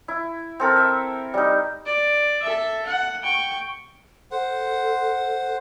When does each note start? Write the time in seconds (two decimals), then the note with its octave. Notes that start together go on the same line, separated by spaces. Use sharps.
0.08 E4
0.60 C4 A4 A#4
0.76 E5
1.34 G3 D#4
1.86 D5
2.43 A4 E5
2.86 F#5
3.23 G5 C#6
4.31 A4 C5 F#5